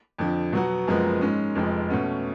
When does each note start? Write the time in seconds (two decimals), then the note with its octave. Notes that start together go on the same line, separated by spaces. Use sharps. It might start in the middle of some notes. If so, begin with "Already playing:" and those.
0.18 F2 D3 F3
0.53 B2 F#3 B3 F#4
0.87 F#1 F#2 F3 G#3 B3
1.21 G#2 G#3 C#4
1.55 F1 F2 F3 G#3
1.89 B2 A3 C#4 F#4